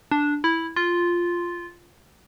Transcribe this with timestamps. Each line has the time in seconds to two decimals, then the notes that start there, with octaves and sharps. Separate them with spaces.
0.11 D4
0.44 E4
0.76 F4